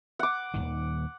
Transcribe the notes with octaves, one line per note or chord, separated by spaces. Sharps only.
F#5 D6
D#1 B1 D#3